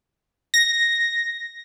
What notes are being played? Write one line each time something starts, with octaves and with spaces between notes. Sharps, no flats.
A#6